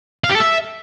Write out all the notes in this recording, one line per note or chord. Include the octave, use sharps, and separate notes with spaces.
F5
G4
A4
E5